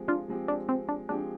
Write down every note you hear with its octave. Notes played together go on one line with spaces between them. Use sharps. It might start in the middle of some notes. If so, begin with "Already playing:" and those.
Already playing: F3 G#3 C4 G4
D4 F4
F3 G#3 C4 G4
D4
C4
D4
F3 G#3 C4 D4 G4